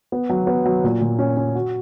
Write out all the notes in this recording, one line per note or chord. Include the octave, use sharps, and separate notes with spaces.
B3
F#3
B3
F#3
A#2
A#2
C#4
C#4
F#4